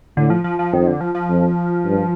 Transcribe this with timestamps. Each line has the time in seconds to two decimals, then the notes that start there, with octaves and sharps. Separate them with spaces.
0.17 A2 D3
0.30 F3
0.44 F3
0.59 F3
0.73 F2 D#3
0.87 D3
1.01 F3
1.15 F3
1.30 F2
1.85 G2